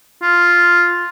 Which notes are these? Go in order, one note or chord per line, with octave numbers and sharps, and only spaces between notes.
F4